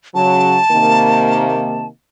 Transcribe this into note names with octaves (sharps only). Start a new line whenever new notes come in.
C#3 F#3 A5
C3 D#3 A#3